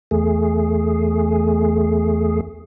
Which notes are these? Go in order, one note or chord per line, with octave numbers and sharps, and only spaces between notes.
E2 A3 G#4